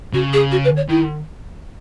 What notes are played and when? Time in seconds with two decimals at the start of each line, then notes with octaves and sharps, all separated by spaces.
0.13 C#3 F#4
0.33 G#4
0.51 F#4
0.64 B4
0.77 C#5
0.89 D#3 E4